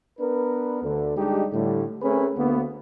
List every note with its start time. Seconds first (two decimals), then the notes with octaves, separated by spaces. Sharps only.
0.19 B3 D4 A#4 B4
0.83 D2 D3
1.17 G3 G#3 D4 D#4 G4
1.53 A2 D3 G3
2.02 A3 C4 C#4 G#4 A#4 B4
2.37 D2 A#3 B3